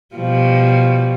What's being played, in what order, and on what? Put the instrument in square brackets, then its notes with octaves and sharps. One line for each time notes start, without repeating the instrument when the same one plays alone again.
[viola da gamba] B2 F3 G3